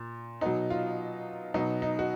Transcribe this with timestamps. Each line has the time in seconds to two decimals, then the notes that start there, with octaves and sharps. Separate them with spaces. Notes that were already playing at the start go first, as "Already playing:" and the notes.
Already playing: A#2
0.41 B2 F#3 D#4
0.70 F4
1.54 B2 F#3 D#4
1.82 D#4
1.99 F#4